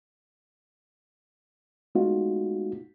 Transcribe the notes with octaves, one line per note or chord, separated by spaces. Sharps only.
G#3 A3 B3 D#4 F4 F#4